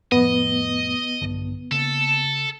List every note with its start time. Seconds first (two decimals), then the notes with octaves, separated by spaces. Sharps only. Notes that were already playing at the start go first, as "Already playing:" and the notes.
0.12 F1 A2 F3 B3 D#5
1.21 A#1 G2 D3
1.72 C#3 A#3 A4